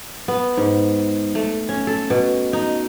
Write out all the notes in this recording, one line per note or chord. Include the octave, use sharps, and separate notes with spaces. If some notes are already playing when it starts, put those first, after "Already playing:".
B3
G#2
A3
C#4
A4
B2
D#4